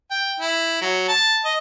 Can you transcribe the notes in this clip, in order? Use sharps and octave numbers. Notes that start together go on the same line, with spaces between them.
G5
E4
F#3
A5
D#5